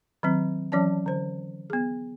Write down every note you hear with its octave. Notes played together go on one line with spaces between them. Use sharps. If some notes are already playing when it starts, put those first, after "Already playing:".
D#3 F#3 C4
E3 F#3 C#4 C#5 D5 A5
D3 C5
B3 G#4